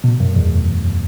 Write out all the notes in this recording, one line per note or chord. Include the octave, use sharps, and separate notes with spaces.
B2
F#2
E2